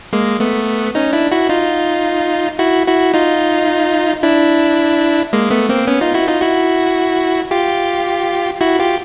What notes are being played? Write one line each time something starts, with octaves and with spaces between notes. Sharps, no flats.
G#3 A#3
A3 B3
C#4 D#4
D4 E4
E4 F#4
D#4 F4
E4 F#4
E4 F#4
D#4 F4
D4 E4
G#3 A#3
A3 B3
A#3 C4
B3 C#4
D#4 F4
E4 F#4
D#4 F4
E4 F#4
F4 G4
E4 F#4
F4 G4